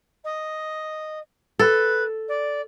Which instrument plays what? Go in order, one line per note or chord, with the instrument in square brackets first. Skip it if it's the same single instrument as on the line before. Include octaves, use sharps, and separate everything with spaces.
[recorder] D#5
[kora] A4 [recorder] B4
[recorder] D5